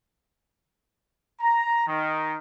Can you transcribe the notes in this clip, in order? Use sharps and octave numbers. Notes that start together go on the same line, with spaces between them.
A#5
D#3